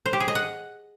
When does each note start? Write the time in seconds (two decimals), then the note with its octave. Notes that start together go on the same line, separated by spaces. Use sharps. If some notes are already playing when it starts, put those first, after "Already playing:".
0.06 C5
0.13 G4
0.20 G#4
0.28 D#5
0.35 F#5